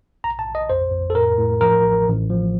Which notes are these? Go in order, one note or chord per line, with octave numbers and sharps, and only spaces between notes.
A#1 A#5
A5
A#1
D#5
F2 C5
F2
A4
A2 A#4
A2
F3 A#4
A1
A1
F3